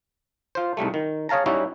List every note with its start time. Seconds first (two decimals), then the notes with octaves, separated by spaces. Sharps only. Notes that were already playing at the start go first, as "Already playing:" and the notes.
0.55 F4 C5
0.77 C2 G#2 G3 A3
0.94 D#3
1.29 G#4 C#5 F5 A5 A#5
1.46 G3 C#4 D#4 E4 F#4